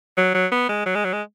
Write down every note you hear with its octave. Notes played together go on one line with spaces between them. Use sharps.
F#3
F#3
B3
G#3
F#3
G#3
F#3
G#3